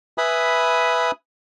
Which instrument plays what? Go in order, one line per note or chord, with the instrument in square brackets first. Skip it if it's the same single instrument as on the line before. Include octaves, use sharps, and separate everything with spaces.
[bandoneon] B4 E5 G#5 B5 D#6